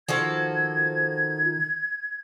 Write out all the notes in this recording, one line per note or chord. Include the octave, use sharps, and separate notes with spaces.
D#3 F3 F#4 A4 G#6